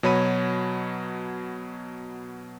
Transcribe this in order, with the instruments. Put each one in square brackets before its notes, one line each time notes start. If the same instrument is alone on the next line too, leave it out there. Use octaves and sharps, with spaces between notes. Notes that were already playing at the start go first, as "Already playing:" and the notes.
[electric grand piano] B2 F#3 C#5 B5 D#7